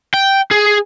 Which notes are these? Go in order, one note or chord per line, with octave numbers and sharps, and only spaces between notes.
G5
G#4